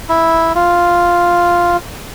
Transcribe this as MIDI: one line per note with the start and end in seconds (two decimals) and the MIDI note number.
0.09 0.52 64
0.55 1.77 65